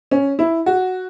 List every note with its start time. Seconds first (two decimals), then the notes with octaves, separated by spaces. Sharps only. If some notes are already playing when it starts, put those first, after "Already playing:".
0.11 C#4
0.39 E4
0.66 F#4